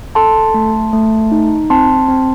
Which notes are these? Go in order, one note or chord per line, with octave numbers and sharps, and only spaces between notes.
A4 A5 C6
A3
A3
D#4
C4 A5 C6
C4